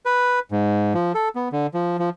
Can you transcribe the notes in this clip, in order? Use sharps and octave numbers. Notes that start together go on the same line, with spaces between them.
B4
G#2
F3
A4
B3
D3
F3
F3